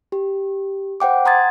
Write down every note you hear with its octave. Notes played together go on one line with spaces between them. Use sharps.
G4
C5 F#5 G5 D6
F#5 A#5 C6 D#6 G#6 A6